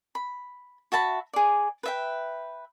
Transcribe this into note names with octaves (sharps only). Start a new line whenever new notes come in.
B5
F#4 E5 A5 B5
G#4 D5
B4 E5 G5